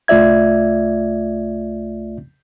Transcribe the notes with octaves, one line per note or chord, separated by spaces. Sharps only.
C2 A3 F4 D5 E5 G#6